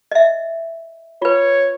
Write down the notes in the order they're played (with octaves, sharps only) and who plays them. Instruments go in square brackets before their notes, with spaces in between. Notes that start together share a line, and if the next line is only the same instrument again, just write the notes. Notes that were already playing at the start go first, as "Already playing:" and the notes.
[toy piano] D#5 E5
[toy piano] F4 B4 [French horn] C#5